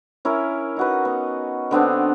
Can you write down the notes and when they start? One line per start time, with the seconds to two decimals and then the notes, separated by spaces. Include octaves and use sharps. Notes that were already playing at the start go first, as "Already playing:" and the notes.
0.25 C#4 E4 A#4
0.77 D#4 F#4 B4
1.05 B3
1.71 D3 B3 C4 D4